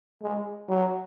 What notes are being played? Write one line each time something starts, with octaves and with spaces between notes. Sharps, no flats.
G#3
F#3